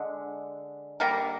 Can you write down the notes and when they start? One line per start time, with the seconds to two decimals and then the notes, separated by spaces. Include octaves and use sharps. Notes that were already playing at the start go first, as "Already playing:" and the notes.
Already playing: D3 G#3
1.00 D3 G3 A#3 A#4